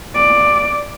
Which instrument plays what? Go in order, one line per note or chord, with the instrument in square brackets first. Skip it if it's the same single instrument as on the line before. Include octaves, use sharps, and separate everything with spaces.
[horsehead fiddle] D5